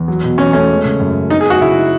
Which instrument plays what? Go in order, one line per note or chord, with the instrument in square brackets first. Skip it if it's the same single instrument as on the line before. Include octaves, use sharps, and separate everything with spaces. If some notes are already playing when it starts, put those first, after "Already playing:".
Already playing: [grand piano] E2
F#3
B2
[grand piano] E2 [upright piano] C#4
[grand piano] A3 [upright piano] C#4
[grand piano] G#3
C#3
F#2
F#2
[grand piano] B3 [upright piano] D#4
[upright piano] G#4
[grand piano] F#3 [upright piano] F#4
[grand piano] C#3 [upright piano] E4
[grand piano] D#4